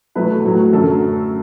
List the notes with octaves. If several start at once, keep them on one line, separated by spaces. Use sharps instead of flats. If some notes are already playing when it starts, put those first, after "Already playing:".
E2 B2 F#3 A3 B4
A2 F#3 A3
F#2 D3 F#3 A3 A4